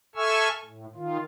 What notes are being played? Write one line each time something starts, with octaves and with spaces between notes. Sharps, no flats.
A4 E5 G#5 C#6 E6 F6
A2
D#3 F4